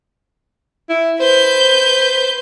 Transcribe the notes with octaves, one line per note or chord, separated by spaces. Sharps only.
E4
B4 C5 G6